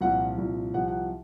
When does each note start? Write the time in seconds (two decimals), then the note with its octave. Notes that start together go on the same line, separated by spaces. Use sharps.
0.01 C2 A#2 F3 F#5
0.38 C2 A#2 F3
0.74 C2 C3 F3 F#5
0.88 F#5